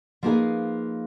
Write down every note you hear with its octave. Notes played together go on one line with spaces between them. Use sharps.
F3 A#3 D#4 G#4 B4